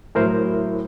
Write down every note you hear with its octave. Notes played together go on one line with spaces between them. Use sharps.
A2 F#3 E4 A#4 C5